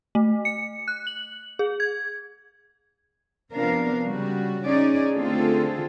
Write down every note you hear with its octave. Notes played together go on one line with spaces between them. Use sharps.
A3
C#7
F#6
F#7
G#4
G#6
C3 F3 B3 D4 A#4 F5
C#3 G3 F#4
C#4 D#4 G#4 D5
D3 A3 C4 F4 G#4 A4